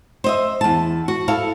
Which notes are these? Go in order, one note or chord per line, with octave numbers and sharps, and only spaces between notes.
C5 D#5 E5
E2 A5
F#4
E4 A4 F5